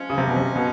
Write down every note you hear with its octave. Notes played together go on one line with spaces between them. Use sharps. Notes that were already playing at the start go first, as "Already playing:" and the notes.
Already playing: F3 G#3 C#4
C#3
C3
B2
C3
B2